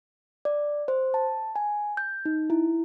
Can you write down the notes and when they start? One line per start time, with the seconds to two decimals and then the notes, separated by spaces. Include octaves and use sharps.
0.45 D5
0.88 C5
1.14 A5
1.56 G#5
1.97 G6
2.25 D#4
2.50 E4